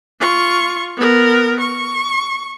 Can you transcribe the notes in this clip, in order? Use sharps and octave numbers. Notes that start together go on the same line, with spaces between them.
F4 C#6
B3 A#4
C#6